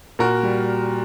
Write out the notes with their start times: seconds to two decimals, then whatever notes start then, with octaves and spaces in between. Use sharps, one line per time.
0.19 A#2 F#4 A#4
0.43 G3